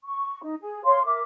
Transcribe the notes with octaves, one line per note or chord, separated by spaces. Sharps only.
C#6
D#4
G#4
C#5 F5 C6
A#4 E5 D6